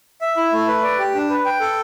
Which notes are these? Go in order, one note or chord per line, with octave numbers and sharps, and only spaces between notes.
E5
E4
A3
B4
D5
G4
D4
B4
G5
A4